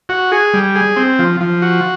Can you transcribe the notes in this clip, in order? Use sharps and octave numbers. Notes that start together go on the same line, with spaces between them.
F#4
G#4
G3
G#4
C4
F3
F3
F#4